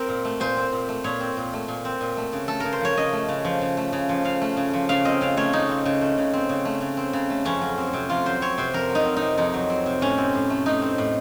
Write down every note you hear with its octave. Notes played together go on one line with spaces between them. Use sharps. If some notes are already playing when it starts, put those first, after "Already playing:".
Already playing: C4 A#4
A#2
A3
A#2 C5
C4
A#2
A3
A#2 C#5
C4
A#2
A3
A#2
C4
A#2
A3
C#3
A3 A4
C#3 A#4
C5
F3 C#5
C#3 D#5
A3
C#3
F3
C#3
A3
C#3
F3
C#3 F5
A3
C#3
F3
C#3 F5
C4 D#5
C#3 F5
A3 C#5
C#3 D#4
C4
C#3
A3
C#3
C4
C#3
A3
C#3
C4
C#3
A3
F2 C#4
F#3
C4
C3
F2 F4
F#3 C5
C4 C#5
C3 C5
F2 A#4
F#3
D#4
C4
D#4
C3
F2 D#4
F#3
C4
C3
A2 C#4
C4
A2
A3
A2 D#4
C4
A2